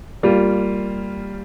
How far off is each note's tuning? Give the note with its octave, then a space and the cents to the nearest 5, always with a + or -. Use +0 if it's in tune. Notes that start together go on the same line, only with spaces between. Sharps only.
G3 +0 A#3 -20 F4 -5